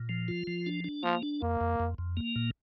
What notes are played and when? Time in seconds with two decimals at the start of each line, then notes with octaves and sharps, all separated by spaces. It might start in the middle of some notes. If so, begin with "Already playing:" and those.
Already playing: A#2
0.09 F3
0.28 F4
0.47 F3
0.66 D4
0.84 D4
1.03 F3 A#3
1.23 D4
1.42 F2 A#3
1.61 F2
1.80 F2
1.98 F2
2.17 A#3
2.36 A#2